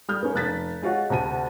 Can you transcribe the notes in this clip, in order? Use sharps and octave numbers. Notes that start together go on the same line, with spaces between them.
G3 D#6 F6 G6
A#3 C#4
F1 F#6 A6 B6
G#3 F4 F#4 C#5 F#5
D2 C3 A5 D#7